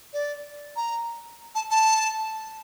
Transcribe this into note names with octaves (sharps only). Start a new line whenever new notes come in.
D5
A#5
A5
A5